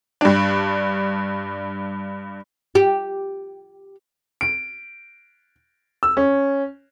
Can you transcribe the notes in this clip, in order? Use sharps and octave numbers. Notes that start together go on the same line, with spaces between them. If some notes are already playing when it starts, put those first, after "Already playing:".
G2 D4
G4
D7
E6
C#4